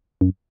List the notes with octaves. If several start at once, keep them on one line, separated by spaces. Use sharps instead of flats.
F#2